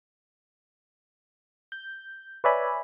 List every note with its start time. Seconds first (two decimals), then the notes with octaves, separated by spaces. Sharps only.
1.72 G6
2.44 B4 C#5 D5 E5 G#5 B5